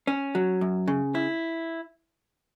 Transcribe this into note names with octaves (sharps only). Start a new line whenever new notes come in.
C#4
F#3
F#2
C#3
E4